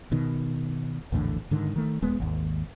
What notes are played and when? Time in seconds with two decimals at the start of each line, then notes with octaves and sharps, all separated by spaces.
0.12 B2 D#3
1.12 A#1 E2 A2 D3
1.51 G#2 D3 D#3
1.76 D#3 A3
2.02 D#1 G#3 B3
2.20 G#1 D#2